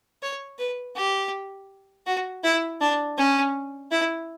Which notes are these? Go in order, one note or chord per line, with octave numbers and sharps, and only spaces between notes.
C#5
B4
G4
F#4
E4
D4
C#4
E4